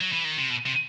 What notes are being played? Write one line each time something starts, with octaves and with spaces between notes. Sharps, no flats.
F#3
E3
D#3
C3
B2
C3